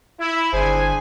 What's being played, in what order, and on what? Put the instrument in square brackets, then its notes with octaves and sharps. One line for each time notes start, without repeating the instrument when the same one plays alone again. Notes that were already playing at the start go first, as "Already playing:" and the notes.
[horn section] E4
[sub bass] G1 [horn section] D4 G#4 G#5 [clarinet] C5